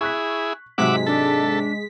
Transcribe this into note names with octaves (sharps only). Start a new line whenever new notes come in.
E4 G#4 C#6 F#6 B6
G#2 C3 F#3 G#3 E5 F#5 D6 B6
D4 A4